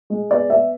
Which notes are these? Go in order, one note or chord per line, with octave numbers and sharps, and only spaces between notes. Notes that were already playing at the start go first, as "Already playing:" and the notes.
G#3
B3 D5
B3 E5